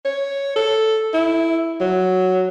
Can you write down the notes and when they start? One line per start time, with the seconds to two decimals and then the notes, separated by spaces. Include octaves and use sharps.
0.05 C#5
0.56 A4
1.14 E4
1.81 F#3